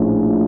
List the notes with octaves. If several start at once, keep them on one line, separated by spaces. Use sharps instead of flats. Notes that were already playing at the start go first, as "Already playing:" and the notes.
Already playing: A#1 A2 F3 A3 C#4